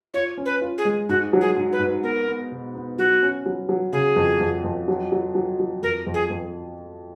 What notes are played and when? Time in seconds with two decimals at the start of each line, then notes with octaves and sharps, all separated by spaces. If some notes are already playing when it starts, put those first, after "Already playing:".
0.14 F4 C#5
0.38 C#4
0.46 B4
0.62 F4
0.78 G#4
0.85 G#3
1.09 G#2 F#4
1.33 F#3
1.41 G#4
1.56 G#2
1.73 B4
1.79 G#2
2.03 B3 A#4
2.27 B3
2.52 B2
2.75 B3
2.98 F#3 F#4
3.23 C#4
3.46 F#3
3.69 F#3
3.93 C#3 G#4
4.16 F2
4.41 F2
4.64 F2
4.88 F#3
5.12 F#3
5.35 F#3
5.60 F#3
5.83 F2 A#4
6.07 F2
6.14 G#4
6.30 F2